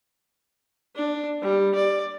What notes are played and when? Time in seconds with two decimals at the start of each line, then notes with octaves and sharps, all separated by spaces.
0.95 D4
1.42 G3
1.74 D5